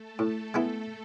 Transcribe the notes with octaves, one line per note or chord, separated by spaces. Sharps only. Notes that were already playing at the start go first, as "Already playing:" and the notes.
Already playing: A3 A4
A2
G#3 B3 E4